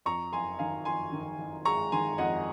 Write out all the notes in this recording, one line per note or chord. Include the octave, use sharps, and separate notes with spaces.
F2 A#5 C#6
F#1 G#5 C6
D#3 F5 G#5
F2 G#5 C6
D#3
F#1
G#3 A#5 C#6
D#3 G#5 C6
F2 D#5 F#5